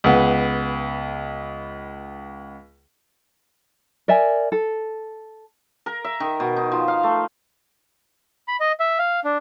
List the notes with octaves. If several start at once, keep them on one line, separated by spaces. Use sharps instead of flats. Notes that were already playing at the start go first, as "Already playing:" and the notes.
C#2 B3
A#4 D5 E5 G#5
A4
A#4
E5
D#3
B2
D#4
F3
F5
A3
B5
D#5
E5
F5
D4